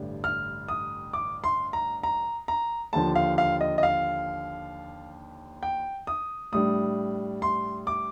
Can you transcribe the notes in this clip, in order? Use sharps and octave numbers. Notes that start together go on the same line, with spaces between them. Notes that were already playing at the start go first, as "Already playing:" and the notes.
Already playing: A1 G2 D3 G3 D4
F6
D#6
D6
C6
A#5
A#5
A#5
D#2 D3 F3 A5
F5
F5
D#5
D#5
F5
G5
D#6
A2 G3 D4 D#6
C6
D6